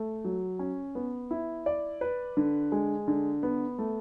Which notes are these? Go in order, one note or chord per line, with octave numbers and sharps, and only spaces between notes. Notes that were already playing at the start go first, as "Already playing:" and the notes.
Already playing: A3
F#3
C#4
B3
E4
D5
B4
D3
G#3
D3
B3
A3